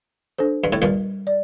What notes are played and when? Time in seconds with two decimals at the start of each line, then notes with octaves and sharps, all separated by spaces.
0.38 D4 A4 C5
0.64 G2
0.73 A2
0.82 G2 A#2 G3
1.27 D5